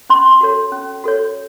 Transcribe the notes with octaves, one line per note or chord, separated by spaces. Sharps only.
C#4 C6
F#4 A4 C#5
C#4
F#4 A4 C#5